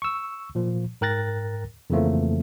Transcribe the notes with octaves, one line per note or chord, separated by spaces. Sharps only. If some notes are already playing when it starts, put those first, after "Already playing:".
C#6 E6
A#2 F3
G#2 A#4 G5 F#6 A6 A#6
F2 C#3 E3 F3 A3 A#3